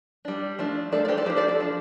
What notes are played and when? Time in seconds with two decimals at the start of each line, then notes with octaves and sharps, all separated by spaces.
0.25 G3 D4
0.59 F3 A3 D4
0.92 F3 A3 D4 A4 D5
1.05 D5
1.08 G4 C5
1.17 A4 D5
1.26 F3 D4 G4 C5
1.37 A4 D5
1.48 A4 D5
1.60 F3 D4